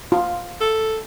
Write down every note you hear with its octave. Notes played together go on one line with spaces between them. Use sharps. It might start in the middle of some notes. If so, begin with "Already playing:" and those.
F4
A4